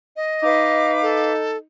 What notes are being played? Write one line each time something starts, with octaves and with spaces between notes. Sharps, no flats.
D#5
D#4 B4 F5 D6
A4